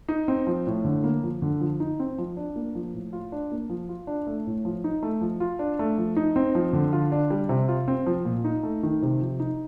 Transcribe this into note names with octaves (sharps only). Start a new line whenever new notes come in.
D#4
C4
F3
A2
D3
A#3
F3
D3
F3
D#4
C4
F3
D4
A#3
F3
A2
F4
D4
A#3
F3
F4
D4
A3
A2
F3
D#4
A3
F3
F4
D4
A3
F3
D#4
C4
F3
D3
F4
D4
G3
C3
F4
C4
F3
A#2
D#4
A3
D#3
C3
F3
D#4